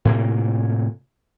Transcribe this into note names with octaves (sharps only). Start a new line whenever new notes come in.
A2 C3 A#3